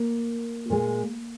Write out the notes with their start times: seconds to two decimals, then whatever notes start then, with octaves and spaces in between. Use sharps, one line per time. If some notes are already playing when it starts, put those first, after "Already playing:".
Already playing: A#3
0.70 A#2 G#3